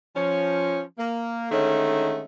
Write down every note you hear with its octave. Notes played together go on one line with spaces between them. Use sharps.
F3 C#4
A#3
D3 D#3 G#3 A3 C#4